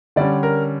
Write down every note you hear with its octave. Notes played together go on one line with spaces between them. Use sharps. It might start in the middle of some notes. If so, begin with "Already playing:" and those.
D3 G3 C#4 D5
A#4